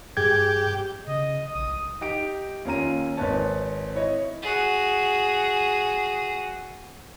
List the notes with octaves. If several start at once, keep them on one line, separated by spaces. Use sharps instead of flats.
G2 G4 G#4 G#6
C#3 D#5
A#1 D#6
C2
D#4 G4 D7
D#2 C#4 F4 A#5 D#7
G#1 C4 D#4 B4 C#5 A5
E4 C#5 D#5 E5
F#4 G#4